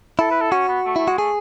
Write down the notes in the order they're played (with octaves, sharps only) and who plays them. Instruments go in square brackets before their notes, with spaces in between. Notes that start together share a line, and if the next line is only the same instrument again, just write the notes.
[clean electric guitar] E4 [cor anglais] A4
[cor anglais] B4
A4
[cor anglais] C#4 [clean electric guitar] F#4
[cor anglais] B3
A3
[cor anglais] A3 [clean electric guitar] E4
[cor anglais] G#3 [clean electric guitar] F#4
[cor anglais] A3 [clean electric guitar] G#4